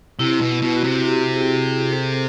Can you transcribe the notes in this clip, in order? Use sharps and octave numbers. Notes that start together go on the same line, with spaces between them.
C3 E4
B2
B2
F#4
C3
G4
G#4
G#4
G#4
A4